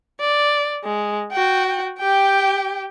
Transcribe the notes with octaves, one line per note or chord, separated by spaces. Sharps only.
D5
G#3
F#4 G5
G4 G5